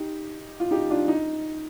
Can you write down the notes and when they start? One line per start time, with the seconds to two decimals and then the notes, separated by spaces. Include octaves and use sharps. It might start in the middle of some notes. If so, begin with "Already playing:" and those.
Already playing: D#4 G4
0.60 F4
0.71 D#4 G4
0.90 D4 F4
1.08 D#4